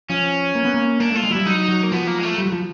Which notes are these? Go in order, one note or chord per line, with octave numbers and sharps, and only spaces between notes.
F3 C#4
A#3
B3
A#3
A#3 D4
A3 F4
G#3
F#3 G3 E4
F#3 D#4
F#3
A#3
F3 B3
A#3
G#3
A3
G3
F#3
F3